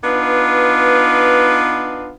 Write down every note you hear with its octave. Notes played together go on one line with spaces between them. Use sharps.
B3 D4 D#4 F4 B4